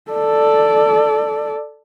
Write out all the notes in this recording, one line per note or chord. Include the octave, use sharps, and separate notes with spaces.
A4 D5